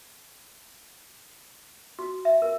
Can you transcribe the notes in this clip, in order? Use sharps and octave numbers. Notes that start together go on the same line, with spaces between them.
F#4
E5
A#4